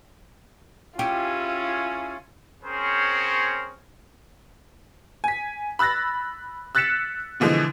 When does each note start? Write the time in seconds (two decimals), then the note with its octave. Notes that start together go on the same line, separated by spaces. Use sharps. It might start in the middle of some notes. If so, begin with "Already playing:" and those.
0.99 C#4 E4 F4 G4 G#4
2.63 C4 C#4 G#4 A#4 C5 C#5
5.24 G#5 B6
5.79 B5 E6 F#6 A6 A#6
6.75 E6 F#6 A6 B6 C#7 E7
7.40 B2 D3 E3 F3 G#3